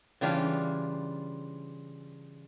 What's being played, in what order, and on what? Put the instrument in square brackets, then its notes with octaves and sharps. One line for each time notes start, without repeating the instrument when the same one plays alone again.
[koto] C#3 E3 G3 D4 F4